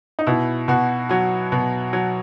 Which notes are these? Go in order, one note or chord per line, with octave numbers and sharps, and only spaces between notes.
D#4
B2 E4
B2 F#4
F#3 F#4
B2
F#3